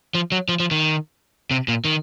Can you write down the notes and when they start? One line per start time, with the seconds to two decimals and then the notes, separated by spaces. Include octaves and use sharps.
0.15 F3
0.32 F#3
0.49 F3
0.60 F3
0.71 D#3
1.51 C3
1.68 A#2
1.85 D#3